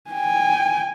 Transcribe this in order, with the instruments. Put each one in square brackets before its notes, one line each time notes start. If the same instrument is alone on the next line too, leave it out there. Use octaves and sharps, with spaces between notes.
[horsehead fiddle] G5 G#5